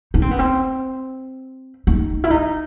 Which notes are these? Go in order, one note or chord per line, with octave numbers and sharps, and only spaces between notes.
D#4
C4
B3
C4
D#4
E4
D#4